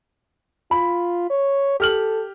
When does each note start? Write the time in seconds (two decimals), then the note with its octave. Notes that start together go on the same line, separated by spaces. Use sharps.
0.71 F4 B5
1.30 C#5
1.80 G4 A4 F6 F#7